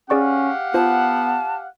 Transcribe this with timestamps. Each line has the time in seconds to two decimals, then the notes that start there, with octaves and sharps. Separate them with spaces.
0.10 C#4 G4 G#4 D5 F5 F#5 C#6
0.74 B3 F4 C5 A5